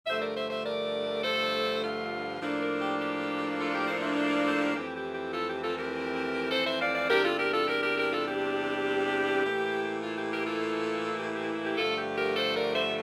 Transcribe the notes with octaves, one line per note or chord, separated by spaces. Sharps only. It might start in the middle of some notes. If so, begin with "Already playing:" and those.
G2 D3 F3 A3 C5 E5
A#4 D5
C5 E5
C5 E5
A#4 D5
A4 C5
F4
A2 F3 A#3 D4
A#4 D5
G4
G4
F4 A4
G4 A#4
A4 C5
C5 E5
C5 E5
A#4 D5
A4 C5
G4 A#4
F2 E3 A3 C4 E4 G4
G4
G4
F4 A4
G4
F4 A4
G4 A#4
A4 C5
C5 E5
D5 F5
D5 F5
E2 C3 G3 D4 G4 A#4
F4 A4
G4 A#4
F4 A4
G4 A#4
G4 A#4
G4 A#4
F4 A4
G4
A2 E3 A#3 E4
F4
G4
G4 A#4
F4 A4
G4
G4
G4
G2 D3 F3 A3 F4 A4
G4
G4 A#4
A4 C5
A#4 D5
C5 E5